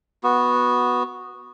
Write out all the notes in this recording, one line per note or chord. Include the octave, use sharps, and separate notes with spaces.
B3 F#4